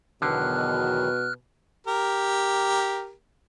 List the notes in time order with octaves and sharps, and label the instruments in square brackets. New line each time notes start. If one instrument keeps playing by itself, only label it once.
[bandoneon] E2 D#3 F#3 [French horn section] B2 [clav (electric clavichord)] D3 [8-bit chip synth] F6 F#6
[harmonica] G4 A#4